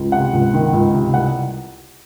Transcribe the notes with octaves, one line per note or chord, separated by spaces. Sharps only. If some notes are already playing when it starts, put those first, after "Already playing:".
Already playing: C#2
C3 F#5
C#2
D#3
C#2
C3
C2 F#5